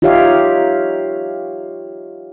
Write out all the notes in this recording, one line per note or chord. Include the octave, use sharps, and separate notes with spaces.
D#4 F4 G4 C#5 E5 F5